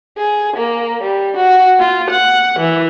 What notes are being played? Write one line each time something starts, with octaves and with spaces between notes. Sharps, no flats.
G#4
A#3
G3
F#4
F4
F#5
E3